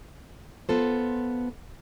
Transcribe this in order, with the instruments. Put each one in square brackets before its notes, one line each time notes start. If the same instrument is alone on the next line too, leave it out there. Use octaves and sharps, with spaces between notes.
[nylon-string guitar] B3 F4 A4 C5